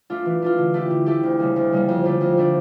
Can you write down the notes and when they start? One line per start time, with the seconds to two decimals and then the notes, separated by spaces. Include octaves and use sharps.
0.10 A3 D4 F4
0.26 E3
0.42 A3 D4 F4
0.58 D3
0.74 A3 E4 G4
0.90 D3
1.06 A3 E4 G4
1.23 D2
1.39 C#3 G3 A#3
1.56 D2
1.72 C#3 G3 A#3
1.89 F2
2.04 D3 A3 D4
2.21 F2
2.37 D3 A3 D4